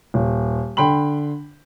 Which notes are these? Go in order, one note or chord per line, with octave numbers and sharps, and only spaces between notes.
D#1
D3 G5 B5 C6 F#7